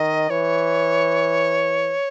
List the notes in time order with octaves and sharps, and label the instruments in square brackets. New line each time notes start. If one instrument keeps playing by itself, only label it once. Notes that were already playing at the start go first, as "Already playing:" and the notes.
Already playing: [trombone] D#3 [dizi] D#5
[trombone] E3 [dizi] C#5